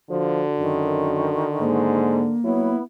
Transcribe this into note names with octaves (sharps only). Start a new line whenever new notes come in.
D3 F3 F#4
F#2 D#3
G#2 A#3
F#3 B3 E4